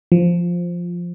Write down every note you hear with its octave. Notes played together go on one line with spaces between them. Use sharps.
F3